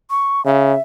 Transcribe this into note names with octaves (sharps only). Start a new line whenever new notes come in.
C#6
C#3 E5